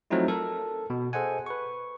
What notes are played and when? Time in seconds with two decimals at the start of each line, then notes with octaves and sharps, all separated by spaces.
0.11 F3 F#3 A3 C4 D#4 E4
0.28 A4 A#4
0.90 B2
1.13 G#4 A4 C5 D#5 F#5 G#5
1.46 B4 C#6